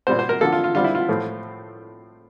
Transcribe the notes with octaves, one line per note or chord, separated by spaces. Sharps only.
A#2 G3 C4 C5
C5
A#4
D3 F3 A#3 A4
F4
F4
D3 G3 C4 F4
E4
F4
A2 F3 A3 C4